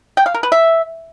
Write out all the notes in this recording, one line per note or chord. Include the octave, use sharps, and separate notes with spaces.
G5
F5
A#4
B4
E5